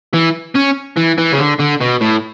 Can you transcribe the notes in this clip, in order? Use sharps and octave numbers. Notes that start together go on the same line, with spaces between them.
E3
C#4
E3
E3
C#3
D3
D3
B2
A2